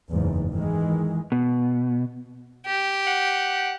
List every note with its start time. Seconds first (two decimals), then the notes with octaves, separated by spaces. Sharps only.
0.10 F#1 E2 G#2
0.52 D#3 E3 G#3
1.32 B2
2.66 G4
3.07 F#5